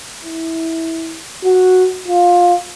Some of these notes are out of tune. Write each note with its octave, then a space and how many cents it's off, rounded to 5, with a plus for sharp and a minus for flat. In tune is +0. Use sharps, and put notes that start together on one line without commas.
E4 -15
F#4 -5
F4 +15